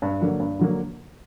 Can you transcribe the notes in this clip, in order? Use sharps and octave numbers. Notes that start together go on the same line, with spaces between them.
G2
D3 F#3 A#3
G2
D3 F#3 A#3